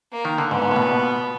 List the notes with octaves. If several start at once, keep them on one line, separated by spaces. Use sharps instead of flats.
A#3
D#3
D3
G#2 B3
G#2
A2
B2
A#2
B2